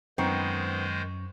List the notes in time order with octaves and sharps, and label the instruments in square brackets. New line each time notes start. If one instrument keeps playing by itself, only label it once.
[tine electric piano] F#2 C#6 [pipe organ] D#3 G#3 C5 [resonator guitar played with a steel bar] B3 C4 D#4